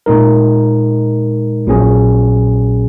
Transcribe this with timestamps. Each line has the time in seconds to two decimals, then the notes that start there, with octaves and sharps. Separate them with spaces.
0.06 A#2 G#3 D#4 A#4
1.67 A#1 A#2 F#3 C#4 G#4